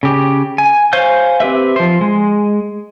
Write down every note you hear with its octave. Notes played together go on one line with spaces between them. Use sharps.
C#3 G4
G#5
C5 C#5 F5 G#5 G6
C4 G4 B4 E5
F3 C5
G#3